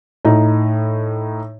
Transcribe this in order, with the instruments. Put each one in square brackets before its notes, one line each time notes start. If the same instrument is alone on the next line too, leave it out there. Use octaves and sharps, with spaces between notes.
[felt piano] A2 D#4